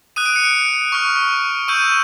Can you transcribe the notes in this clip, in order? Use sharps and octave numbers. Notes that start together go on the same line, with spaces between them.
D#6 F#6 D#7
D7
C#7
D7
C#6 F6
C#6 E6 G6 D#7